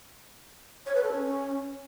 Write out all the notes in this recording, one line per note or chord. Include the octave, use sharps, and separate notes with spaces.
C#5
B4
A4
C#4